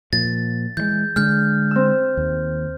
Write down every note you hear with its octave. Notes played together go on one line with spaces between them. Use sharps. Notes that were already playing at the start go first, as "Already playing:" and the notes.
A#2 F3 A6
E3 F3 G#3 G6
D3 G#3 F6 G6
C4 E6
D#2